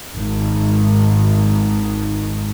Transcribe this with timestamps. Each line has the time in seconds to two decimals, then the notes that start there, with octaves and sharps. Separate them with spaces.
0.18 G#1 D#3